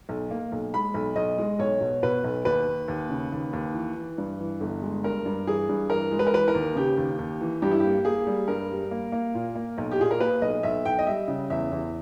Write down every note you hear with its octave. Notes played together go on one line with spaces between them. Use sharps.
B1
A#3
B1
G#3 B5
B1
B1 D#5
G#3
B1 C#5
B2
B2 B4
B1
D#2 B4
D#2
D#2
C#3
D#2
D#2
E3
E3
G2
E3
G1
G#3
G2 A#4
G2
E3 G#4
G2
E3 A#4
G#3
B4
A#4
E3 B4
A#4
D#2
C#3 G4
D#2
D#2
E3
G2 G4
E4
A#3 G4
A#3 G#4
G3
G2 A#4
G3
A#3
A#3
A#2
A#3
B1
G4
A#2 G#4
A#4
A#3 B4
B1 D#5
B1 E5
B1 G5
D#5
G3 E5
C#3
E2 E5
E2